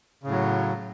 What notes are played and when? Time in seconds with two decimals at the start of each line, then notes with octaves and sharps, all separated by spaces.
0.24 C#3
0.27 A2
0.31 F#3